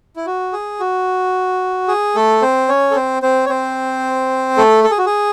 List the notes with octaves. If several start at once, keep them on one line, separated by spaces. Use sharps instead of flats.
E4
F#4
G#4
F#4
G#4
A3 A4
C4 C5
C#4 C#5
A4
C4 C5
C4 C5
C#5
C4 C5
A3 A4
A4
G#4
F#4
G#4